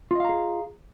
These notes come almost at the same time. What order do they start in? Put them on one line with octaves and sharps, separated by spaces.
F4 D#5 F5 A#5 G#4